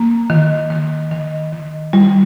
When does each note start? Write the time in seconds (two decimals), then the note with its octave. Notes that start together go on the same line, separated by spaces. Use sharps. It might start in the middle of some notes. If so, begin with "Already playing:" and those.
Already playing: A#3
0.30 D#3
0.70 D#3
1.12 D#3
1.53 D#3
1.93 G3